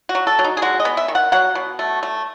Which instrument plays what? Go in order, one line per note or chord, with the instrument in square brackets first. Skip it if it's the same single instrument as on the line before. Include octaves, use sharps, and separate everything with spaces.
[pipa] F#4
F#3
A4
F#3
D#4
G#4
G#3 F#4
D#5
B3
E5
D#3
F#5
F#3 F#5
B2
A3
A3